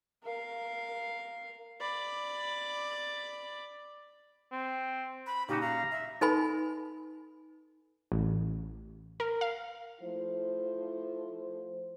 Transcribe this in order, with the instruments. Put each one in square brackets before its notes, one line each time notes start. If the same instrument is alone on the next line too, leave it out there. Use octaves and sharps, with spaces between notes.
[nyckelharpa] A#4 F5
D5 B5
[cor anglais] C4
[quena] B5
[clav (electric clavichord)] A#2 C#3 F#4 [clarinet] D#4 [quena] G4
[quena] F5 [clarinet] A#5
[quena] E5
[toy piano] D#4 A4 B4 G#5 B5
[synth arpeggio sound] A1
A#4
F5
[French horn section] F3 A3 E4 C5